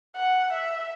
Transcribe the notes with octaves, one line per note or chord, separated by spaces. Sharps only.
F#5
E5